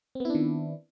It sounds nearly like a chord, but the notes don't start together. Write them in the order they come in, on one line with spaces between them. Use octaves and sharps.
C4 B3 E4 D4 D#3